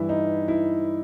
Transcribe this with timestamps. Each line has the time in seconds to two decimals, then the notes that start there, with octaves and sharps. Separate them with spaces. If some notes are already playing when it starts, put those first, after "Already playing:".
Already playing: G2 E3 E4
0.09 D#4
0.48 E4